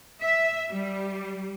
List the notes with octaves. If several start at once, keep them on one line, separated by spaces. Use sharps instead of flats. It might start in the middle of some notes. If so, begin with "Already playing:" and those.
E5
G3